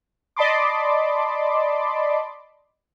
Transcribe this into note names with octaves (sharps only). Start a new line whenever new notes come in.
D5 D#5 A5 B5 C6 D6